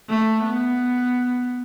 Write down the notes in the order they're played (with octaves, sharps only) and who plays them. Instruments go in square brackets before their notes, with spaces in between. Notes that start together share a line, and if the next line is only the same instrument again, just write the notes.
[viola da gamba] A3
B3